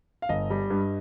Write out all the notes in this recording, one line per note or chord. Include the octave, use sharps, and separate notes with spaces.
F5
G1 D#5
G3
G2